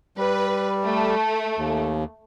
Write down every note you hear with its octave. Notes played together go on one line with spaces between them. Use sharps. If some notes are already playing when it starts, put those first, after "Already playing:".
G3 B4
A3
D#2